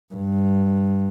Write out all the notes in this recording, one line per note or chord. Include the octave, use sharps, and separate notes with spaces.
G2